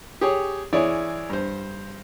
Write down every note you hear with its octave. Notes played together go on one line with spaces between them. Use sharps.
G4 G#4 C#5
E3 E4 G#4 C#5 D5
G2 C5